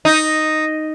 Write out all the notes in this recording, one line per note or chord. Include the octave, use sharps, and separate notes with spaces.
D#4